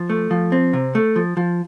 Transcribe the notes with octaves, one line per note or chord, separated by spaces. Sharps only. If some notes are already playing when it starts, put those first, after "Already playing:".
Already playing: F3
A3
F3
C4
C3
A3
F3
F3